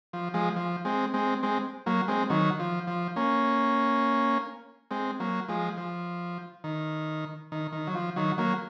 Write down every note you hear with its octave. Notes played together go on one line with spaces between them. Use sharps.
F3
F3 G#3
F3
G#3 C4
G#3 C4
G#3 C4
F#3 A#3
G#3 C4
D#3 F#3
F3
F3
A#3 C#4
G#3 C4
F#3 A#3
F3 G#3
F3
D#3
D#3
D#3
F#3
F3
D#3 F#3
F#3 A#3